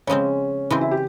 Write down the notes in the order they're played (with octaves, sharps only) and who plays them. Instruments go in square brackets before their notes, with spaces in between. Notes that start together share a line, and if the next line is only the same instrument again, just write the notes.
[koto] C#3 F3 G#3 C4 [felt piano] C#4
[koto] C#3 E3 G#3 C4 [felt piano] E4
[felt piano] E4
G4